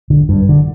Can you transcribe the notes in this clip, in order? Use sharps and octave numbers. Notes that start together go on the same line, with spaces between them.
D3
G2
D3